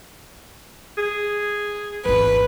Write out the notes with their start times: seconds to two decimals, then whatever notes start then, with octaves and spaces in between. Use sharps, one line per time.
0.98 G#4
2.05 G#1 E2 B4